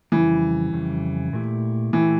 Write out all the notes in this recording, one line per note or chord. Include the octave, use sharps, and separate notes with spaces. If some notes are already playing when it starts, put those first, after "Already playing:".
F2 C#3 E3 G3
F2 C#3 G3
A#2 A3 E4 G4
A#2 E3 A3 E4 G4